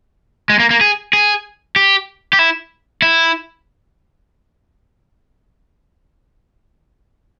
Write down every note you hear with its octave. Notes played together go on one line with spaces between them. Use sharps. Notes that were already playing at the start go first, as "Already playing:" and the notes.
G#3
A#3
A#3
G#4
G#4
G4
G4
E4
E4